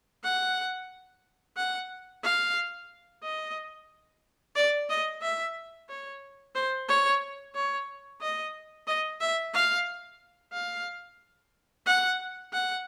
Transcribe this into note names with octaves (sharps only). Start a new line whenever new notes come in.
F#5
F#5
F5
D#5
D5
D#5
E5
C#5
C5
C#5
C#5
D#5
D#5
E5
F5
F5
F#5
F#5